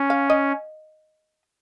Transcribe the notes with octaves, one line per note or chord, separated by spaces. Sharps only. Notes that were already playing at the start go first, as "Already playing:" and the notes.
Already playing: C#4
F5
D#5